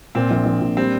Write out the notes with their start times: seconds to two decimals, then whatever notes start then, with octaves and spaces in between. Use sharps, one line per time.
0.15 A#2 C4
0.31 A#1
0.46 A#1
0.61 A#2
0.77 G3 C4